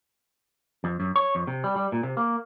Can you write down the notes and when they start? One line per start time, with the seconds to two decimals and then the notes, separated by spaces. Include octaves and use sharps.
0.84 F2
1.00 F#2
1.16 C#5
1.35 F2
1.47 C3
1.64 G3
1.76 G3
1.92 A#2
2.03 C3
2.17 A#3